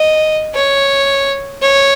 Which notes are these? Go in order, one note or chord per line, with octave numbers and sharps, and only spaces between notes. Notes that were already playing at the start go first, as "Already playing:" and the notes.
Already playing: D#5
C#5
C#5